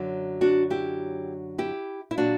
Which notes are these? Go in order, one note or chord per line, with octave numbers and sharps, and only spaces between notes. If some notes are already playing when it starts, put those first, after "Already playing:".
Already playing: F#2 D3 F#3
D4 F#4
E4 G4
E4 G4
E4
A#2 F#3 D4 F#4